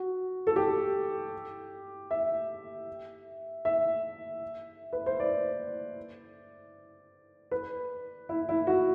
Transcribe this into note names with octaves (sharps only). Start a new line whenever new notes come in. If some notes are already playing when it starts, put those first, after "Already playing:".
Already playing: F#4
A4
G4
E5
E5
B4
C5
D5
B4
E4
E4
F#4